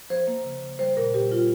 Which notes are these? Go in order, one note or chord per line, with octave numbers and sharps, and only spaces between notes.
F3 C5
A#3
C#3
C#3
G3 C5
A#2 A#4
G3 G4
G3 F4